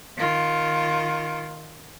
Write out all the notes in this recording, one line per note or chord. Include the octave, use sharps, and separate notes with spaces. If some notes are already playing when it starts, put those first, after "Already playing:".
D#3 F4